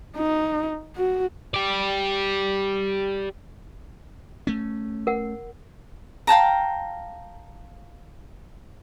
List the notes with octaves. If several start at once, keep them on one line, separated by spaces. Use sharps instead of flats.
D#4
F#4
G4 D5
A3 C#4
A#4 F#5
F5 G5 A5 A#5